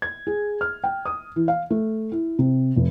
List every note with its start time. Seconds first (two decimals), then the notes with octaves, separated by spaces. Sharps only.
0.02 G#6
0.27 G#4
0.61 F6
0.84 G5
1.06 D#6
1.36 E3
1.48 F5
1.70 A3
2.12 E4
2.39 C3
2.76 F1